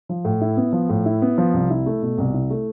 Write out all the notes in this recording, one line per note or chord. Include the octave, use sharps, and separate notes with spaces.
F3
A2
E4
B3
F3
A2
E4
B3
F3
C2
E4
A3
B2
C2
E4
A3